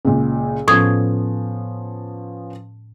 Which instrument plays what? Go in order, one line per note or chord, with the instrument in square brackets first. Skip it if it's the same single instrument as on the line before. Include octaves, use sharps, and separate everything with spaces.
[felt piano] C#2 A#2
[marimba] A2 D#6 G#6 [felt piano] F3 B3 C#4